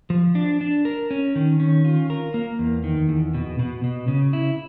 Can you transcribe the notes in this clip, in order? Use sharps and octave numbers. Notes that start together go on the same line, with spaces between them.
F3
D4
D4
A#4
C#4
D#3
C#4
F4
A#4
A#3
E2
D#3
E2
B2
B2
B2
C#3
E4